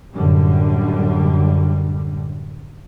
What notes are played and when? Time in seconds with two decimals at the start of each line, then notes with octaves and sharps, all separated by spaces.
0.13 F#2 A2 D3 G3